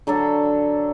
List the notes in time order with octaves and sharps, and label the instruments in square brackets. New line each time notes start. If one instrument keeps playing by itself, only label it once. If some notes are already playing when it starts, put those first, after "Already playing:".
[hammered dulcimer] D3 F#3 D4 A4